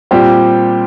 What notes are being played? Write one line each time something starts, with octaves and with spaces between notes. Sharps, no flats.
A#2 G3 C4 G4 C5